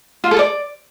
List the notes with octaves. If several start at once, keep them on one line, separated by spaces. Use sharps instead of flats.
F4
A4
D5